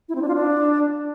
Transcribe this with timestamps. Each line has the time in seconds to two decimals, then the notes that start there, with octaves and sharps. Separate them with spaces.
0.09 E4
0.15 C4
0.22 D4
0.28 F4
0.35 D4